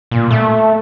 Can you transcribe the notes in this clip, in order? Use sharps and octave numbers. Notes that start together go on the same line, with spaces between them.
A#2
A3